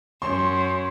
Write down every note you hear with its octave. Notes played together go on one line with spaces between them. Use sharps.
F#2 C6